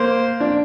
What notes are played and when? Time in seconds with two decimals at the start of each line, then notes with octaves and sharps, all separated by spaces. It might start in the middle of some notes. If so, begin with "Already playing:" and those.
Already playing: A#3 C5
0.40 D4